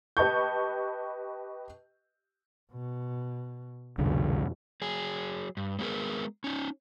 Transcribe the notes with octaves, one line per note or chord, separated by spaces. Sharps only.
G4 B4 D#5 A5 C#6 G6
B2
C2 F2 B2 D3
F#3 G#4
G2
G#3 B3 F4 G#4 A#4
C#4 D#4